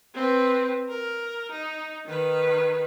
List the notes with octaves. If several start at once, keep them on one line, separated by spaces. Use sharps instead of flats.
C4 B4
A#4
D#4
D#3 B4